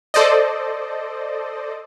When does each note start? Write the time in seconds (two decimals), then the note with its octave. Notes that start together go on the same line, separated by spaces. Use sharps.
0.14 A4 C5 D5 D#5